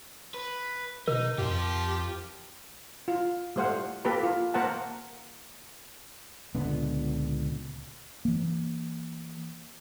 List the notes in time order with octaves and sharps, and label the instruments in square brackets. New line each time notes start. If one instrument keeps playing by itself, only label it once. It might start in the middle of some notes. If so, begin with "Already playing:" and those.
[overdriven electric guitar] B4
[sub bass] B2 [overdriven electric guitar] D#4 [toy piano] A#4
[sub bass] F2 [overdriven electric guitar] F4 C5 [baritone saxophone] G4
[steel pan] F4
G3 A3 C5 F5 F#5
A#3 G4 A4 B4 B5
F4
A#3 A#4 C5 F#5 A5
[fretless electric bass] C#2 A#2 D3 B3
E3 A#3